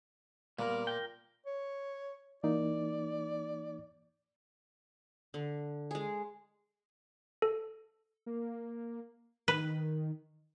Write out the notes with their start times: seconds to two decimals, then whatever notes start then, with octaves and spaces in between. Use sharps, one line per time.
0.59 A#2 G3 B3 A#4
0.87 A#4 G5
1.46 C#5
2.44 E3 A#3 D#4 D5
5.34 D3
5.91 G#3 G#4
7.42 A4
8.26 A#3
9.48 D#3 B4